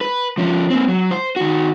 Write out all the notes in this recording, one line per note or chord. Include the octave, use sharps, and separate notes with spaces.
B4
F3 C#4
A#3 C4
F#3
C5
D#3 F#4